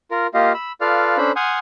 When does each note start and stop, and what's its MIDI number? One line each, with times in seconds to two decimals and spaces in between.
0.11 0.27 65
0.11 0.27 70
0.34 0.53 58
0.34 0.53 65
0.34 0.53 67
0.34 0.53 75
0.34 0.53 77
0.54 0.72 83
0.54 0.72 88
0.81 1.17 65
0.81 1.17 69
0.81 1.17 71
0.81 1.17 74
0.81 1.17 77
0.81 1.17 89
1.18 1.32 61
1.18 1.32 62
1.18 1.32 69
1.18 1.32 72
1.18 1.32 83
1.36 1.59 78
1.36 1.59 80
1.36 1.59 84
1.36 1.59 87
1.36 1.59 89
1.36 1.59 91